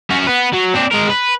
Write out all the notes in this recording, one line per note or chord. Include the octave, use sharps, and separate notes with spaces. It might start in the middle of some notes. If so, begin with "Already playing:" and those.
C#4 F#4
B3 B4
F#3
C4 D4
G#3 A#4
B4